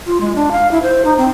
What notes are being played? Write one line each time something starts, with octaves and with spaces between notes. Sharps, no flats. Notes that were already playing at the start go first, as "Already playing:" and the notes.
F4
G#3
D4
F5
E4
C5
D#4
C4